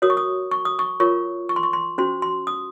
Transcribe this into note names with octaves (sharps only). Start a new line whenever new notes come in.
F#4 A#4 C#5 D#6
C#6
D#6
C#6
D#6
C#6
F4 A#4 C#5 C#6
C#6
C6
C#6
C6
C#4 F#4 C5 C6
C6
D#6